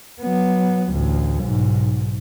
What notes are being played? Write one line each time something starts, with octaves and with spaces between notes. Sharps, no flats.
F#3 B3
A1 D2
B1 G#2